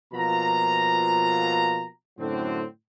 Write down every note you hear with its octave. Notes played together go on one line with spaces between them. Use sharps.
B2 F3 A#3 F4 A#5
F#2 A2 D3 F#3 C4